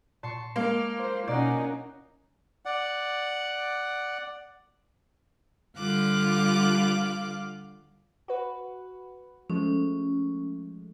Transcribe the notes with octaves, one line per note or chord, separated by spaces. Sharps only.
A#2 A5 C6 C#6
G#3 A#3 F5 D6
C5
B2 C#4 D#4 D5 F#5
D5 F#5
D3 G3 F4 F5 D6 F#6
F#4 B4
F3 G#3 A3 C#4